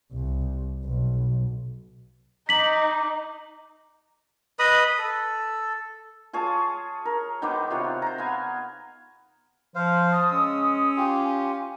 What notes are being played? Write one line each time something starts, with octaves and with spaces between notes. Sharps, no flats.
C2
B1
D#4 A#5 D6 B6 F#7
B4 D#5 B5 D#6
A4
F4 G#4 C#5 A5
A#4
D#3 B3 C5 D6
C3 F4 C#5 F#5
C5 A#5
B3 F5 G#5
F3 C5 F5
A5 D#6
G#3 C#4 E6
F4 G4 G#5